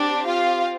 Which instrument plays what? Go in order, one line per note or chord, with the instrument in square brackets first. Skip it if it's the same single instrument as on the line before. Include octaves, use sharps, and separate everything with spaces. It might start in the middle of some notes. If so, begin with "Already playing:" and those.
Already playing: [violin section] C4 D4 G4 D5
F4 F5